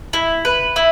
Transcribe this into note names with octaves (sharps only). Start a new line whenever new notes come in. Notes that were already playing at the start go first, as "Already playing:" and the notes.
E4
B4
E4